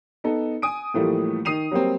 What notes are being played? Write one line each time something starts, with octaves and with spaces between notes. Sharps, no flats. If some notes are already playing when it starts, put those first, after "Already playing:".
B3 D#4 A4
G#5 D#6 D7
A2 E3 F3 G3 A3 A#3
D#3 D#6 C7 D#7 F7
F#3 G3 A#3 C4